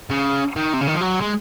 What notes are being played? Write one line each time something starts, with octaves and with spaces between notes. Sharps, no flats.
C#3
D#3
C3
C#3
D#3
F3
F#3
G#3